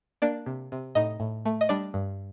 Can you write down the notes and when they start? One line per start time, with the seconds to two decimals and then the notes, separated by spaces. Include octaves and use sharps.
0.22 A#3 D4 D5
0.46 C3
0.72 C3
0.95 A2 D#4 D#5
1.20 A2
1.45 A3
1.61 D#5
1.69 G3 D4 D5
1.94 G2